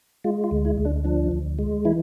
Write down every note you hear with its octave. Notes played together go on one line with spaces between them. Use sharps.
G#3 F4
F4
D2
E4
D2
D4
F3 D4
D2
G#3
E3 E4